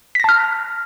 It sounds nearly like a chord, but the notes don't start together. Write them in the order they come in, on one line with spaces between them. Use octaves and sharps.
B6 A#6 A5 F6